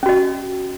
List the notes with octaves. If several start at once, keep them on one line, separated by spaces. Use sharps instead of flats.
C#4 F#4 D#5